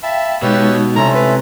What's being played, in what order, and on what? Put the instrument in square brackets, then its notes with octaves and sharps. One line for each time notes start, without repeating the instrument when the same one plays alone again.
[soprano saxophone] E5 [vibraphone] F5 G5 [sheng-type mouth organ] A5 B5
[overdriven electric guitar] B2 [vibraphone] G#3 D#4 [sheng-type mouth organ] G4 B4 E6 [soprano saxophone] C#5
[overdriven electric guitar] C2 [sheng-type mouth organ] C#4 E4 A4 [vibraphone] E5 C6 [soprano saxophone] A#5
[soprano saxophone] B4